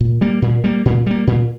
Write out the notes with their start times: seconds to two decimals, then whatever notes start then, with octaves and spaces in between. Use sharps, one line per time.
0.01 A#2
0.21 G3 A#3
0.42 A#2
0.64 G3 A#3
0.85 A#2
1.06 G3 A#3
1.27 A#2